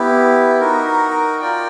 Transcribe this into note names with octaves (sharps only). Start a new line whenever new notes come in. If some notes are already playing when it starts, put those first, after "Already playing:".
Already playing: B3 E4 G4
D#4 F#4 A#4
F4 A#4 D5 G5